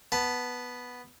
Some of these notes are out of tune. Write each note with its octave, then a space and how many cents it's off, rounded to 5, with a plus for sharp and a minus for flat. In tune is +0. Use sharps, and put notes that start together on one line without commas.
B3 +0 A5 +0